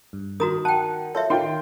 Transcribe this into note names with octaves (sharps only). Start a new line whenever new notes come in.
G2
D#3 F#4 A#5 D#6
F#5 G5 A5
F4 A4 C#5 E5
D#3 F4 G5 C6